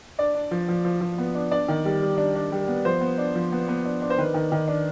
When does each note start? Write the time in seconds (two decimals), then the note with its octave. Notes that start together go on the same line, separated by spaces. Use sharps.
0.19 D4 D5
0.35 D4
0.51 F3
0.68 F3
0.84 F3
1.01 F3
1.18 B3
1.35 D4
1.51 D4 D5
1.68 D#3
1.85 G3
2.02 G3
2.18 D4
2.36 D4
2.52 G3
2.68 B3
2.85 F3 C5
3.01 B3
3.18 D4
3.35 F3
3.52 B3
3.68 B3
3.85 D4
4.02 D4
4.10 C5
4.18 D#3 B4
4.34 D#3
4.52 D#3
4.68 D4